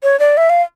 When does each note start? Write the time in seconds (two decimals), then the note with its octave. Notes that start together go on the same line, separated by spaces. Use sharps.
0.03 C#5
0.20 D5
0.37 E5
0.50 F5